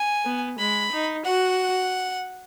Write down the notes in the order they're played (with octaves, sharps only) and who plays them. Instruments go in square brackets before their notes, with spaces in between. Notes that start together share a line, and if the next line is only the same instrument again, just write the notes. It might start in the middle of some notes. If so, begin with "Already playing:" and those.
Already playing: [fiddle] G#5
[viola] B3
[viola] G#3 [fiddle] B5
[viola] D#4
[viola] F#4 [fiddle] F#5